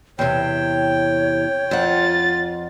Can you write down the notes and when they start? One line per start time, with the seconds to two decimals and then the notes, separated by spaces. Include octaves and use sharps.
0.19 E2 C3 C#5 G5
1.71 F2 F4 F#5 A6